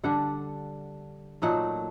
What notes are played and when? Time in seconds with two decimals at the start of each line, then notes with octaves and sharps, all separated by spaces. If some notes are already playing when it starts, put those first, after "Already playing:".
0.04 D3 G3 D4 F#5
1.42 A#2 F#3 A3 D#4 F#5